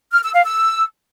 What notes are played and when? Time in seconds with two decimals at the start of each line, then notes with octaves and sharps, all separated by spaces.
0.13 F6
0.24 E6
0.35 F5
0.45 E6